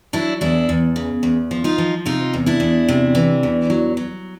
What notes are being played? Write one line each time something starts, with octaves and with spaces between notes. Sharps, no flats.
F#3 D4 E4
E2 D4 E4
E2
C#3
E2
F3
D#4 F4
F3
C3 D#4 F4
E2
D4 E4
E2
C3
E3
E2
F#3
F#3